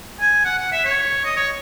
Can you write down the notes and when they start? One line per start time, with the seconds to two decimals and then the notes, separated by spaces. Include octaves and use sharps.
0.20 G#5
0.45 F#5
0.58 F#5
0.72 E5
0.85 C#5
1.24 D#5
1.37 C#5